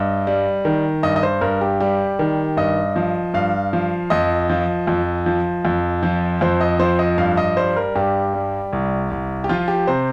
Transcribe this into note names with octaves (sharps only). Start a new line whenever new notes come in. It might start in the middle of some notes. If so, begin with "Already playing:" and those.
Already playing: G2 D#5
G3
D#3
G2 D#5
D#5
C5
G2 A#4
G4
G3 G4
D#3
G2 D#5
F3
G2 F5
F3
F2 D#5
F3
F2
F3
F2
F3
F2 C5
D#5
F3 C5
D#5
G2 F5
D#5
G3 C5
A#4
G2 G4
G3
C2
C2
G4
F3 F4
G4
C3 C5